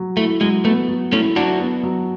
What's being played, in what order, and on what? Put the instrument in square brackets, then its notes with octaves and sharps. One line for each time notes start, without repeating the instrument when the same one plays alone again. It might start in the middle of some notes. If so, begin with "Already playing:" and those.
Already playing: [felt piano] F#3
[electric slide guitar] A3 [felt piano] E4
[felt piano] F#3 [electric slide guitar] G#3
[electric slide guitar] A3 [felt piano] B3
[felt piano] F#3
[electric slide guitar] A3 C#4 [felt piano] E4
[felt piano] F#3 [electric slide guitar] D4 F#4
[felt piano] B3
F#3